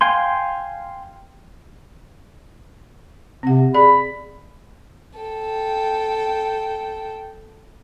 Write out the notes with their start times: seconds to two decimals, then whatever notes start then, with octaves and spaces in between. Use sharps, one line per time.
0.01 F5 G5 G#5 C6
3.43 C3 C4 F#5
3.74 G#4 D5 B5
5.19 A4 G5